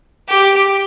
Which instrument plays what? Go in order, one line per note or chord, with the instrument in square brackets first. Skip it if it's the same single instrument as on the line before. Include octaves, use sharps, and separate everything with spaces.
[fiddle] G4